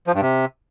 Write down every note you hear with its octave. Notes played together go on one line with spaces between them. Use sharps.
F3
G2
C3